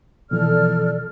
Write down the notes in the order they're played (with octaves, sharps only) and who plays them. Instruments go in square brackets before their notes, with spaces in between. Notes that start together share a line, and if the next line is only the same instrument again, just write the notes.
[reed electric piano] B2 E3 F3 [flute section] A4 D5 F6